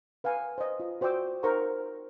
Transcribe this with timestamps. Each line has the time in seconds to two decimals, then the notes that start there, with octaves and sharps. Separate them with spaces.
0.24 B4 F5 F#5 G#5
0.58 C5 D#5
0.80 F4
1.01 F#4 C5 D5 G5 D6 E6
1.43 D#4 A#4 C5 F#5 A#5 C#6